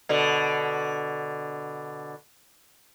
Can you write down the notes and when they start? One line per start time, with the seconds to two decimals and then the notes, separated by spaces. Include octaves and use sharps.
0.09 B2 D3